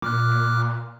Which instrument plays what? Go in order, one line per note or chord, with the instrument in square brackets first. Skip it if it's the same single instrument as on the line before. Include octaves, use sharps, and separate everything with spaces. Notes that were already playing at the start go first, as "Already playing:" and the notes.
[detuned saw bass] A#2 [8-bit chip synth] D6 F6 F#6